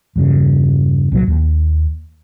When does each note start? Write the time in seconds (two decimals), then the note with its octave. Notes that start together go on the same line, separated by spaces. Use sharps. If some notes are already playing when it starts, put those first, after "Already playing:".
0.16 E2 G2 C#3
1.12 C2 A#2 E3 F#3
1.28 D#2